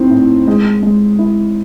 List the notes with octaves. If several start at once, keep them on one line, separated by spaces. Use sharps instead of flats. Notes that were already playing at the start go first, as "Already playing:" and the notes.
Already playing: A2 C4 D#4
A2
G#3
G#3
E4